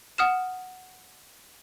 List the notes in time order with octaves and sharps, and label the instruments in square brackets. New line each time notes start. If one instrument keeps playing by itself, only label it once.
[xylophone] F#5 D#6 F6 E7